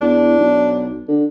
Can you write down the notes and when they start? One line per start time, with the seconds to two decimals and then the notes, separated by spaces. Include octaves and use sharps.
0.01 E2 D4
0.38 B1
1.08 D3